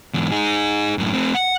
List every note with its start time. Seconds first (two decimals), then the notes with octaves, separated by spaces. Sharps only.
0.14 E2 G#2
0.31 D#4 G#4
0.98 F#2 A2
1.13 A3 C4
1.34 F#5